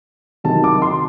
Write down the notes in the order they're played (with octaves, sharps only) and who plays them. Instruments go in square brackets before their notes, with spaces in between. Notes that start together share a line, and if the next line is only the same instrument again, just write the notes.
[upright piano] C3 D#3 F#3 A5
D6
C6